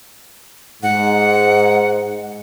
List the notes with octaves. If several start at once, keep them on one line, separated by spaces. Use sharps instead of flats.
G#2 F#5